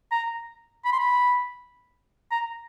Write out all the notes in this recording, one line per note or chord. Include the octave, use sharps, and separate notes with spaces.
A#5
B5
C6
B5
A#5